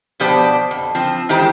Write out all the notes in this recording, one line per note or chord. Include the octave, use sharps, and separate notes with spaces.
B2 F3 B3 G4 C5 D5
F2
F3 C4
A2 D#3 E3 G#3 G4 C5